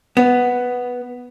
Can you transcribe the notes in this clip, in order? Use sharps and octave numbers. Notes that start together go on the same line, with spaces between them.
B3